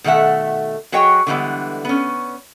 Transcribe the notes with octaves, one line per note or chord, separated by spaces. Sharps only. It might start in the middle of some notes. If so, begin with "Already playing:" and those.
B2 D#3 A3 E5 F#5
F#3 F#4 G#4 C#5 D#5 G5
D3 E3 G3 G#3 B3
B3 C#4